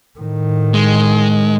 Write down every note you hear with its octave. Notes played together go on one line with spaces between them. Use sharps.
A2 D#3
G#3